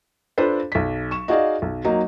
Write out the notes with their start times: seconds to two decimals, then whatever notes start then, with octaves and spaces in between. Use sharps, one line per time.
0.38 D4 F4 A4 B4 C5
0.72 B1 B6
1.11 C#6 E7
1.28 D#4 F#4 G#4 D5 D#5 F5
1.62 B1
1.85 F#3 A#3 D#4